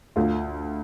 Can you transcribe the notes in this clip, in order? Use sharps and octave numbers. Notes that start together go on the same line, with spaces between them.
D2 F4